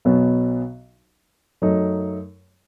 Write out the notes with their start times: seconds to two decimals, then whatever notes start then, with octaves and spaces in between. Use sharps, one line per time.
0.05 B1 B2 F#3 B3
1.62 F#2 F#3 A3 D#4